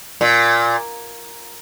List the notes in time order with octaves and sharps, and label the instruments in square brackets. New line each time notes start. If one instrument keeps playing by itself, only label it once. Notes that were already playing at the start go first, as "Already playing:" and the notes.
[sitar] A#2